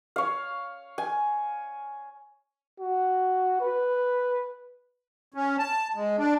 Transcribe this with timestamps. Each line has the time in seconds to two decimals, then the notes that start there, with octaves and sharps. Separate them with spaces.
0.16 C#5 F5
0.98 G#5
2.80 F#4
3.61 B4
5.34 C#4
5.58 A5
5.95 G#3
6.18 D4